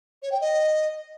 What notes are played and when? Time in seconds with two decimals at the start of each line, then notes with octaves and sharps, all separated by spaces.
0.22 C#5
0.32 G5
0.41 D#5